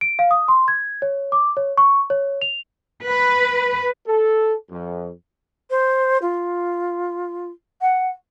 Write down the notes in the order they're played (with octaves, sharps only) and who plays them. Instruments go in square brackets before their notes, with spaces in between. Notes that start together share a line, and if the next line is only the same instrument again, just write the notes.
[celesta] D7
F5
D#6
C6
G#6
C#5
D6
C#5
C#6
C#5
F7
[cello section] B4
[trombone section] A4
F2
[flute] C5
F4
F#5